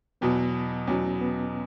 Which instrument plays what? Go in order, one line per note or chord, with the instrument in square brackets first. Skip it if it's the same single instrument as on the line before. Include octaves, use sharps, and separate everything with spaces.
[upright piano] E2 B2 F#3 [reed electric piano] B3
[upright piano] E2 B2 F#3 [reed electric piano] C#4
[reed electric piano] B3